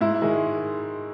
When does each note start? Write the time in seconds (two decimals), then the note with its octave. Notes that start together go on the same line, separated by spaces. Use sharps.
0.01 G#2 E4
0.22 D#3 G#3